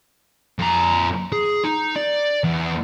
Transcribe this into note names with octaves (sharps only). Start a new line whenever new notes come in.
F2 A#5
G#4
D#4
D5
E2